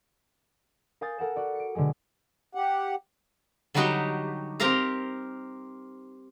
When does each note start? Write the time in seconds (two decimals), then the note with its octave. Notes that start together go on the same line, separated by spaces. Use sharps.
1.01 A#4 F5 G#5 D#6 G6 A6
1.19 A4 A#4 F#5 E7
1.36 F#4 D5
1.55 C#7 D7
1.75 B2 D3 F#3 G#3 G#4
2.55 G4 F#5
3.74 D3 F#3 G3 D#4 F#4 G4
4.60 C4 G4 A#4 F5 A#5